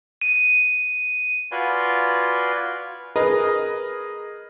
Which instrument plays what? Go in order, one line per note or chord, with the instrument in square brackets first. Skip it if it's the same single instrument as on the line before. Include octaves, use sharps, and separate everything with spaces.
[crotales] D#7
[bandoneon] F4 F#4 B4 D5 G#5 C6
[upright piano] G#4 A#4 B4 D#5